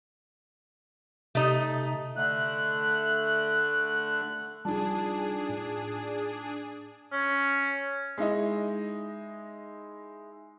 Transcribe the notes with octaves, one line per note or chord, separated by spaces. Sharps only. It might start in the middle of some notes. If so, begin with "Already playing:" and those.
C3 A3 D#4
D3 A3 F#6
C2 F3 G3 D4 D#4 F4 G#4 A5
A2
C#4
G#3 D#4 E4 D#5